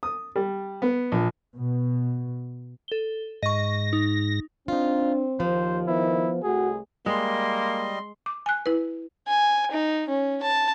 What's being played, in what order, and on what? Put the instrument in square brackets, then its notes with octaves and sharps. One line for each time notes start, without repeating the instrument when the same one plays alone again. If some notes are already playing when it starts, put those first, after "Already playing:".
[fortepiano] D#6
G3
B3
A#1
[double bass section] B2
[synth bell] A4 G7
[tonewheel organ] G#2 A#6 [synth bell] D#5 C#6
[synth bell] D#4
[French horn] C4 [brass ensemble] D4 [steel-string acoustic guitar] D#4 F4
[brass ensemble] D#2 [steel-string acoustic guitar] F3 [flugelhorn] C5
[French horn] D#3 [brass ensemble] B3 C5 [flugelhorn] E4
[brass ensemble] C2 A3 [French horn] F#4 [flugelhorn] G#4
[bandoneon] G3 D#5 [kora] G#3 [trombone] A#3 [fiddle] C6
[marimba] D6
G#5 F#6
E4 B4
[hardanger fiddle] G#5
D#4
C#4
A5